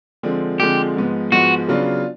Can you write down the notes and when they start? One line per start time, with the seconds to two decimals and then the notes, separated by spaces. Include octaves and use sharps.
0.23 D3 F3 G#3 C4
0.60 D3 F3 G#3 C4 G4
0.96 G#2 F3 G#3 B3
1.32 G#2 F3 G#3 B3 F#4
1.68 C#3 F#3 B3 D4 F4